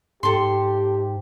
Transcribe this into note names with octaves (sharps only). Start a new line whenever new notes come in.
G#2 G4 A4 C6